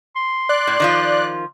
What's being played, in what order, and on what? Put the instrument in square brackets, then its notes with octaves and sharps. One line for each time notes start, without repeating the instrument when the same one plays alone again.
[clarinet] C6
[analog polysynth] D5 F#6
[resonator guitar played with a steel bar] A2
D#3 F3 F4